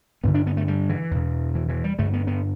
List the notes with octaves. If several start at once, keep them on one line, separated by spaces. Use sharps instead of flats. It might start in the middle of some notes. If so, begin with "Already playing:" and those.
G2 D3 B3
D4
B3
A3
G3
E3
E2 B2
E3
E3
G3
G2 D3 A3
B3
B3